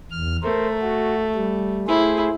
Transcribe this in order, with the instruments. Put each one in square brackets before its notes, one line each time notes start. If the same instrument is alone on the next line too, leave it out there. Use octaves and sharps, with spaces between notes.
[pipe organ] E2 F6
[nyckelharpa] A3 [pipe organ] A#4 C5
[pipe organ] F#4
G3
[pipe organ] A3 G#4 C5 [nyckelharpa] E4